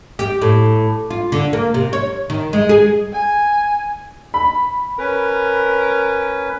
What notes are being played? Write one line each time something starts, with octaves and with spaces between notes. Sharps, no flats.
G4
A2
F4
D3
A#3
C3
C#5
D#3
G#3
G#4
G#5
B5
C#4 A#4 B4